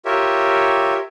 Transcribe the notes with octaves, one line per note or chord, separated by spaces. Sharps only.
F4 G4 A#4 C#5 E5